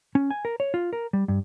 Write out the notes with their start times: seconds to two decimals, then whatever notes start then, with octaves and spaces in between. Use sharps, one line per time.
0.15 C#4
0.31 G#5
0.45 A#4
0.60 C#5
0.74 F4
0.93 A#4
1.13 G3
1.28 G2